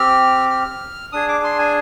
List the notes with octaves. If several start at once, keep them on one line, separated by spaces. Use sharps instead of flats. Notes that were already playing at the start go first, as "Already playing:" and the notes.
Already playing: C4 G4 F6
F6
D4 G#4 D#6
D6
C6
G#5